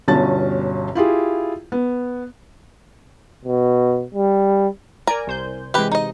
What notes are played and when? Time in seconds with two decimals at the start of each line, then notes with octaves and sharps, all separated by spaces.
0.08 G1 G2 B2 C#4 A5 A6
0.95 E4 F4 G4 G#4
1.72 B3
3.45 B2
4.14 G3
5.07 A#4 D5 G#5 A#5
5.27 C2 C5 G6
5.74 C3 E3 G#3 G4 B4
5.92 D#4 D#5